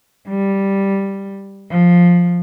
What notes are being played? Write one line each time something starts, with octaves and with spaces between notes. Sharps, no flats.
G3
F3